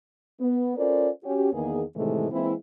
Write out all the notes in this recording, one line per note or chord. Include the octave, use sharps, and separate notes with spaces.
B3
C#4 F4 A4 A#4 C5 D5
C#4 F#4 G4
E2 D#3 A#3 B3 G#4
A2 C3 D#3 E3 G#3 A3
E3 G#3 A#3 C4 E4